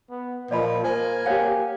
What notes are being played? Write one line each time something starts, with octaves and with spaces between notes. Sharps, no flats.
B3
A#2 F3 D5 D#5 B5
A#3 C5 G#5
G4 A#4 C#5 F5 F#5